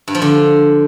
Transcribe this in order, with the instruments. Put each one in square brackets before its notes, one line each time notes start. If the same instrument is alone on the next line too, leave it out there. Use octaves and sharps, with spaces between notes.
[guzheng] G2
F3
D3